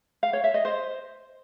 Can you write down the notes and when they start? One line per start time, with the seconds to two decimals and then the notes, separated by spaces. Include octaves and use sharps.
0.23 F5
0.33 C#5
0.44 E5
0.54 D#5
0.65 C5